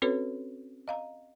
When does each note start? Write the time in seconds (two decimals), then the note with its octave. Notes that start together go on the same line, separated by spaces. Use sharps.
0.02 C4 C#4 F#4 A4 B4 C#5
0.88 D#5 F5 A#5